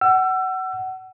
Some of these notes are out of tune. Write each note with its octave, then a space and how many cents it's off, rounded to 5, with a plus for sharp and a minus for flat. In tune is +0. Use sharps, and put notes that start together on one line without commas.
F#5 +25 E6 +30